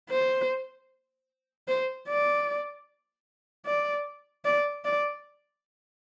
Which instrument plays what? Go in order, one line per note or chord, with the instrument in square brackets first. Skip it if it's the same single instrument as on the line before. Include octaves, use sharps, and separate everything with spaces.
[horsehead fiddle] C5
C5
D5
D5
D5
D5